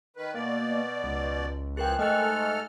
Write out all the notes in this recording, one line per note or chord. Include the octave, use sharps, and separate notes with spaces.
D#3 B4
B2 A#3 D5
C#2
E3 F3 G#4 A#4 G5 F#6
G#2 A3 A4 D#5 G#5 F6 F#6